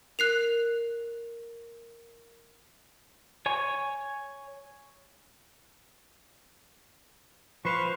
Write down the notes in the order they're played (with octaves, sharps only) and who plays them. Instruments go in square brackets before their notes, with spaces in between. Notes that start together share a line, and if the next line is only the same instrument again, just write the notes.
[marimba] A#4 [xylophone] F#6 C7 F7
[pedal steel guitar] C#5 G#5 C#6
[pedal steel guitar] F3 C5 F5 [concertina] B4 C#6